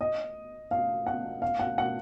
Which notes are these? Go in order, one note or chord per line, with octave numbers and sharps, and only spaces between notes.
D#5
F5
F#5
F5
F#5
F#5